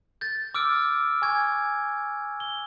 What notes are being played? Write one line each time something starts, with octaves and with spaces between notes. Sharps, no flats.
G6 A6
D6 E6 F6 D7
G#5 C#6 G#6
G7